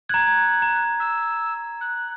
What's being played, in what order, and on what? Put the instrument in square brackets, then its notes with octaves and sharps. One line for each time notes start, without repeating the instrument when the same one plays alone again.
[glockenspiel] A#5 G#6 [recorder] F#6
[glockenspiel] A#5
[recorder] E6
F#6